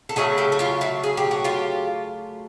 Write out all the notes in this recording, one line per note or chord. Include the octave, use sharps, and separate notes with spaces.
A4
C#3 F#3 A3 F#4 G#4
G4 A4
F#4
F4 G4
E4 F#4
G#4
G4
F#4
F4 G4